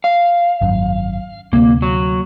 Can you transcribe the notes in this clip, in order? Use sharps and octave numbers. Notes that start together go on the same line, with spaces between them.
F5
G#1 F#2
D2 C3 A#3
F#3